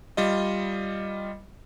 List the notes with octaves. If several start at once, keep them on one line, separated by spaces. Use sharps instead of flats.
G3 F4 D#5